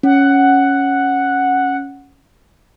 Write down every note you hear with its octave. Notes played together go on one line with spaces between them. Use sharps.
C#4 F#5